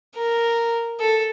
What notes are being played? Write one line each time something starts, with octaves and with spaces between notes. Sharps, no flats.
A#4
A4